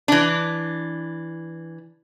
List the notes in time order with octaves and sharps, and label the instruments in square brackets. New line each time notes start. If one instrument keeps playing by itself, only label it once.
[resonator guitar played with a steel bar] E3 D4